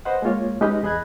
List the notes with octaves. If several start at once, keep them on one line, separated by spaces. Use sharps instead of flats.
B4 C5 D#5 F#5
G#3 A#3 F4 C#5
G#3 C#4 D#4 G4 B4 D#5
E2 G#4 D#5 B5 F#6 G#6